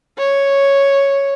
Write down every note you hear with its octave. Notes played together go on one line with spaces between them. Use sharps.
C#5